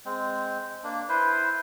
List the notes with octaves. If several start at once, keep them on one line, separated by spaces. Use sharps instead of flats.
G#3 C4
A#3 D4
E4 B4 C5